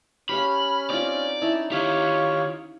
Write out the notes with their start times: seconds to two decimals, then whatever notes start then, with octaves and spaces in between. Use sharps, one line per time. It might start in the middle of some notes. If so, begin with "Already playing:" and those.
0.29 C#4 G4 C#5 F5 B5 F6
0.90 C4 D#4 F4 D5
1.42 C#4 D#4 E4 A5
1.72 D#3 F4 G4 C#5